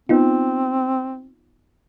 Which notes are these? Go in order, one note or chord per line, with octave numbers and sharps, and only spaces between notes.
B3 C4 D#4 F4